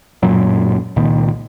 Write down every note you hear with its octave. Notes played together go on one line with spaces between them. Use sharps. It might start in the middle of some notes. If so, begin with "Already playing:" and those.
D1 F#2 A#2 F#3
C#2 A#2 D#3